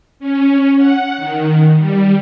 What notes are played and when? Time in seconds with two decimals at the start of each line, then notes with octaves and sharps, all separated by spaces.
0.20 C#4
0.77 F#5
1.18 D#3
1.77 G3